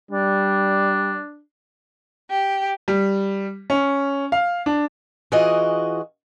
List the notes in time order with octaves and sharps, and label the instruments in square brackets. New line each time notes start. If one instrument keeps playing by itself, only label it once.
[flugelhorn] G3 [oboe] D4
[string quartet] G4
[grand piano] G3
C#4
F5
D4
[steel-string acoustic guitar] E3 F4 F#4 G#4 D#5